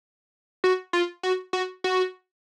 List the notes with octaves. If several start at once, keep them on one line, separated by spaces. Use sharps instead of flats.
F#4
F4
F#4
F#4
F#4